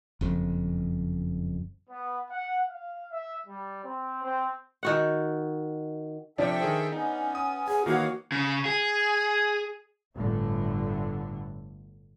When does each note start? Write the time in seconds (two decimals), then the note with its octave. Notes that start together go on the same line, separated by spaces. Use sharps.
0.21 F#1 F2
1.90 B3
2.30 F#5
2.68 F5
3.11 E5
3.46 G3
3.83 C4
4.23 C4
4.83 D#3 F#4 F#5
6.38 C3 F3 D4 A4 E5 G5
6.60 D#3 G#4 C5
6.92 B3 C#4 D#4
7.35 D#6
7.68 G#4 G#5
7.86 D#3 E3 A#3 F#4 C#5 F5 F#5
8.32 C#3
8.66 G#4
10.16 G1 A2 D3 A3